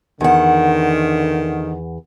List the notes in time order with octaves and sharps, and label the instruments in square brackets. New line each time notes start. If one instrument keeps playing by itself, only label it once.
[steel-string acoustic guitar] E2 F#5 [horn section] D3 D#3